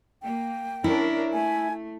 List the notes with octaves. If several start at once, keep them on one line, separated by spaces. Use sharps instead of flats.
A#3 G5
C#4 D4 E4 A#4
A3 G#5